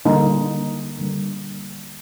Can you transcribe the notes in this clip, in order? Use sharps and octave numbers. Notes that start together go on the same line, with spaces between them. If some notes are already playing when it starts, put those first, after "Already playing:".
D3 G3 A#3 D#4
D3 G3 A#3